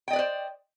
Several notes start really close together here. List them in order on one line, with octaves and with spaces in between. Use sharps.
G5 D#5 D5 B4 C5